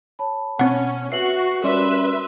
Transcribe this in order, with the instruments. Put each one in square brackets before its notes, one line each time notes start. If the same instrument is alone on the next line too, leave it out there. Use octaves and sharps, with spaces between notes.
[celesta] C#5 A5 B5
[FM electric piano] B2 [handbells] C4 F#5 [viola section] C#4
[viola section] F#4 [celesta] B4 F#7 [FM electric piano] E5 C7
[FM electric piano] G3 C#4 D5 [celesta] F#4 A#4 C6 [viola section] B4 E5